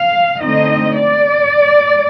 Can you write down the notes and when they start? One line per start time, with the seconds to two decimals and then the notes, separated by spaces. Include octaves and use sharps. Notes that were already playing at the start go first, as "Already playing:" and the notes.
Already playing: F5
0.41 D3 A3 C4 D#4 D#5
0.97 D5